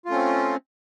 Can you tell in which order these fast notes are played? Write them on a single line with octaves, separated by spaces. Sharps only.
F4 A3 C#4 C4